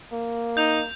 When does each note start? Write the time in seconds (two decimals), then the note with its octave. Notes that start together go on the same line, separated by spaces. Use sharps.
0.12 A#3
0.57 D#4 G6 F7